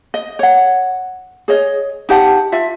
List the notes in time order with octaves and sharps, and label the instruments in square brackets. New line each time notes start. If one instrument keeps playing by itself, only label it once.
[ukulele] D#5
C#5 F#5
G#4 C#5 D#5
D#4 G4 F#5 A5
F4 E5